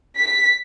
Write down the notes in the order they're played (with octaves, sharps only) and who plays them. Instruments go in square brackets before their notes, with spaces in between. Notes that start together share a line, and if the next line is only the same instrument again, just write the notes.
[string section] B6